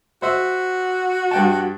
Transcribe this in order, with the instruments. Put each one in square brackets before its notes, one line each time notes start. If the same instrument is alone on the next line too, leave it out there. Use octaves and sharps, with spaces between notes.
[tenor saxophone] F#4 [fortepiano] C5 E5
[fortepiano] G2 G5 A5